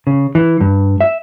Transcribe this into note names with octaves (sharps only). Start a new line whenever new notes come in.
C#3
E3
G2
E5